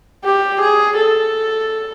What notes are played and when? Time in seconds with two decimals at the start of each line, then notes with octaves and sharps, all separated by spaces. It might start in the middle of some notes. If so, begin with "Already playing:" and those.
0.25 G4
0.62 G#4
0.98 A4